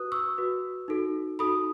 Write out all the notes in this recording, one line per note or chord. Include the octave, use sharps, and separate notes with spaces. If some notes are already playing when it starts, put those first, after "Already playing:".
Already playing: F#4 B4 D#6 F#6
C#6 E6
F#4 B4
D#4 F#4 A4
D#4 F#4 A4 B5 D#6